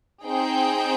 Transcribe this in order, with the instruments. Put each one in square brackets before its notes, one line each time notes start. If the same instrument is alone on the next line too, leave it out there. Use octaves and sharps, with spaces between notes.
[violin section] C4 D#4 G#4 G5